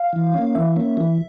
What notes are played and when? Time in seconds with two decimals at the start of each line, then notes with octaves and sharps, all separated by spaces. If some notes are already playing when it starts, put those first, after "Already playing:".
Already playing: F5
0.13 E3
0.34 A#3 C#4
0.55 E3 E5
0.76 A#3 C#4
0.97 E3